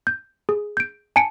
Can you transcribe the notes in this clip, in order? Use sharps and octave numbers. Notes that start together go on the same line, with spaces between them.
G6
G#4
G6 D7
G#5 A5 C#7 D7